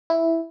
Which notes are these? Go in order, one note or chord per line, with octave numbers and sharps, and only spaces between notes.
E4